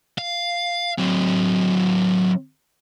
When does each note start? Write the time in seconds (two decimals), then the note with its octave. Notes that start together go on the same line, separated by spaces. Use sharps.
0.18 F5
0.98 F#3 C4